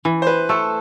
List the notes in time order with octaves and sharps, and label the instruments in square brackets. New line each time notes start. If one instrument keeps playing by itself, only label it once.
[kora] E3
[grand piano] C5
B4
[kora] A3 [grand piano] A4